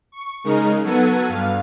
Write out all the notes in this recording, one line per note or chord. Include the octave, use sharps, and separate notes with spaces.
C#6
C#3 G#3 D#4 A#4
F#3 B3 A4 F#5 G#6 D#7
G2 F5